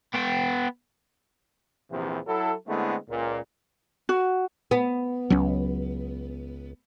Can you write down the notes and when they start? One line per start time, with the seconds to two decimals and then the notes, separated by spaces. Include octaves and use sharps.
0.15 B3 G5
1.91 A#1 E2 C3
2.27 F#3 E4 A4
2.68 D3 G#3 A3 B3 C4 E4
3.09 C#2 A#2
4.09 F#4
4.71 B3
5.30 C#2 F#3 C#4